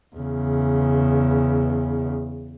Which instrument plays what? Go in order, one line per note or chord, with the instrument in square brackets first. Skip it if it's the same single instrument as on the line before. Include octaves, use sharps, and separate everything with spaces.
[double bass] E2 C#3